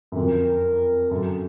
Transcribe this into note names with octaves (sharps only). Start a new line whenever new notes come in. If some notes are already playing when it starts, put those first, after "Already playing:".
F#2
F2 A#4
F#2 A4